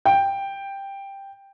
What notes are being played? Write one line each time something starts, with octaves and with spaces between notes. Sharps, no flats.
G5